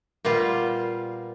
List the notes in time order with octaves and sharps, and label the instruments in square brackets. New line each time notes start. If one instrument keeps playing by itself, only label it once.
[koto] A#2 G3 B3 F4